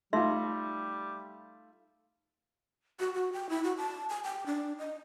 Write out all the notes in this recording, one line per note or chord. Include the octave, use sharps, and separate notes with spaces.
G3 A3 D#4 F4 E5 C6
F#4
F#4
G5
E4
F#4
A5
G#5
G5
D4
D#5